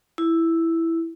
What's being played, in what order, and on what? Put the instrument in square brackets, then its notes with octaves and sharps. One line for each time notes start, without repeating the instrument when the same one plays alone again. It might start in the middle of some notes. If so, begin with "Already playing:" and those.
[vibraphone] E4